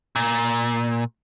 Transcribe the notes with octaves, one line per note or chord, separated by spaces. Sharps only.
A#2